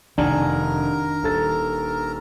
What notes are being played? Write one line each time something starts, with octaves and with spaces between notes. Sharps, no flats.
F1 D#3 D4 A#4 G#5 A#5
D#1 A4 A6